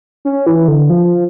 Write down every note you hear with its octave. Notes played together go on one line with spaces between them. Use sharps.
C#4
E3
D3
F3